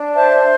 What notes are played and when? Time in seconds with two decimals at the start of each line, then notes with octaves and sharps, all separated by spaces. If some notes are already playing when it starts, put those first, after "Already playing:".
Already playing: D4
0.15 C5 E5 A5